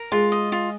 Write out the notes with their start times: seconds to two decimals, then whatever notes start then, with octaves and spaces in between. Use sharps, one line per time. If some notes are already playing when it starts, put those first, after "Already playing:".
Already playing: A#4
0.12 G#3 F4
0.32 D#5
0.52 F4